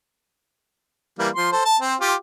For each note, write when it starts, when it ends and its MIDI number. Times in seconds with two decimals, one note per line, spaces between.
1.19 1.29 52
1.19 1.29 55
1.19 1.29 58
1.36 1.50 53
1.36 1.50 84
1.52 1.64 69
1.52 1.64 72
1.65 1.77 81
1.79 1.95 60
1.79 1.95 72
2.01 2.14 65
2.01 2.14 67